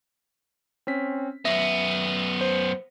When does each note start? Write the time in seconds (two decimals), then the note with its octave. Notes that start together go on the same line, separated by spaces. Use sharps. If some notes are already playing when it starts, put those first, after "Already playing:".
0.87 C4 C#4 B6
1.45 F#2 B3 E5 A#6
2.41 C5